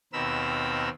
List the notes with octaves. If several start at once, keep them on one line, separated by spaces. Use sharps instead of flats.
D#2 B2 C4 A#4 B5 E6